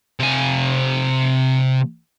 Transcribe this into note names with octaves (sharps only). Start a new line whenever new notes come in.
C3 G#5